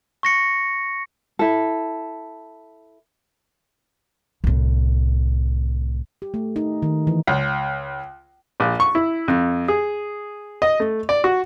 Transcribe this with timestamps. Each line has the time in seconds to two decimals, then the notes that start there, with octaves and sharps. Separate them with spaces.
0.23 C#6 A#6 C#7
1.39 E4 A4
4.44 C2 A2
6.22 G4
6.34 A3
6.56 D#4
6.82 D#3
7.07 E3
7.27 C#2
8.60 A#1
8.80 C#6
8.95 E4
9.28 F2
9.68 G#4
10.62 D#5
10.80 A3
11.09 D5
11.24 F#4